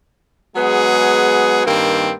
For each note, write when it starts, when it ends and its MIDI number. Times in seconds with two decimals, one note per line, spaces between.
0.55 1.62 54
0.55 1.62 56
0.55 1.62 59
0.55 1.62 68
1.66 2.11 43
1.66 2.11 51
1.66 2.11 58
1.66 2.11 60